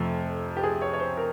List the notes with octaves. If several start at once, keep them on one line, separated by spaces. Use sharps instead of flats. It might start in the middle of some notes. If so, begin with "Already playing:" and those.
Already playing: F2 C3 F3 A3
G4
G#4
C#5
C#5
C5
A#4